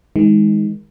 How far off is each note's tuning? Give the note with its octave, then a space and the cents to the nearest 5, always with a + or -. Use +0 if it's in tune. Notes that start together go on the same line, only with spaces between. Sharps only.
D#3 +25 G#3 -10